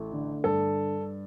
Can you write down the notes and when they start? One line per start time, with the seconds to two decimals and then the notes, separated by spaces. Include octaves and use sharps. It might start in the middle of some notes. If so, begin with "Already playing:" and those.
Already playing: A1 A3
0.12 D3
0.44 G2 A4